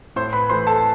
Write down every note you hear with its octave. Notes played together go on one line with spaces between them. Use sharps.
A2 C5 C6
B4 B5
E3 A3 C5 C6
A4 A5